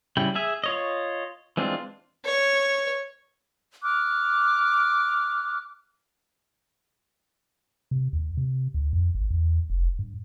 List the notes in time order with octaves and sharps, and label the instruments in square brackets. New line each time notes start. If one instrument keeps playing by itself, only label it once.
[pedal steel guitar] C#3 G3 E4 G5
G#4 E5 G#5
F4 C#5 D#5
E3 G#3 C4 D4 F4
[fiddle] C#5
[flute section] D6 F6 F#6
[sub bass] C3
D#2
C3
D2
F2
G#1
E2
F1
G2